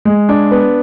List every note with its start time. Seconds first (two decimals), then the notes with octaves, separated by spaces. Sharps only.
0.05 G#3
0.29 D4
0.51 B3